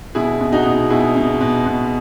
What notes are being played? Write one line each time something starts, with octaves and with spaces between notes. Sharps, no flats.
B2 E4 G#4
B2
D#4 F#4
B2
B2 E4 G#4
B2
B2
B2